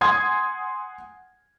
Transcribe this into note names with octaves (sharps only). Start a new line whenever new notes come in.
F#5 G#5 C6 D#6 G#6